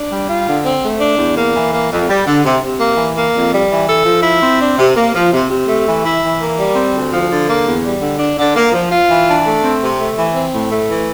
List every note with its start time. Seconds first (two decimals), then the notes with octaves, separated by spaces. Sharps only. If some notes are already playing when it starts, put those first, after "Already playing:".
Already playing: D4
0.10 G3
0.28 F4
0.45 D3
0.63 C4
0.82 A3
0.99 D4
1.18 E2
1.36 A#3
1.54 E3
1.71 A#3
1.90 F2
2.08 G3
2.26 D3
2.43 C3
2.61 C3
2.79 A#3
2.97 E3
3.16 A#3
3.33 F2
3.52 G3
3.70 E3
3.87 A4
4.05 F3
4.23 E4
4.42 C4
4.59 D4
4.77 C3
4.95 A#3
5.13 F3
5.32 C3
5.49 C3
5.67 A3
5.85 E3
6.03 E4
6.22 E3
6.39 A#3
6.57 G3
6.74 C4
6.92 D2
7.10 F3
7.29 D3
7.46 A#3
7.65 E2
7.83 G3
8.01 D3
8.18 D4
8.37 D3
8.55 A#3
8.72 F3
8.90 F4
9.09 E3
9.27 D4
9.45 A3
9.62 C4
9.81 C3
9.99 A3
10.17 E3
10.34 C4
10.52 A2
10.71 A3
10.88 E3